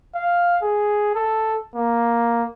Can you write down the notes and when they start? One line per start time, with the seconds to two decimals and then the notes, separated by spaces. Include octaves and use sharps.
0.15 F5
0.62 G#4
1.15 A4
1.75 A#3